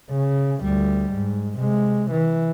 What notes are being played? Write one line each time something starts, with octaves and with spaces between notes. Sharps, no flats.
C#3
D2 G3
G#2
C3 G#3
E3